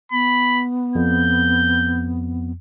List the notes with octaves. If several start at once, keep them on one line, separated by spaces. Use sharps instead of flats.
B3 B5
F2 G6